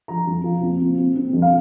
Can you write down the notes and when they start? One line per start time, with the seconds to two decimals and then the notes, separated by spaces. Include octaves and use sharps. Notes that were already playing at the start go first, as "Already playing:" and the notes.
0.08 F3 A#5
0.27 F2
0.44 F3
0.62 C4
0.80 C4
0.98 C4
1.16 C4
1.33 F2
1.42 F5